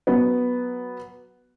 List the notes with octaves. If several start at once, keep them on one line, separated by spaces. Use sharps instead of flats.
F#3 B3